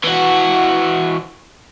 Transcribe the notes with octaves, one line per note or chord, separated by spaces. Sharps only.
E3 F#4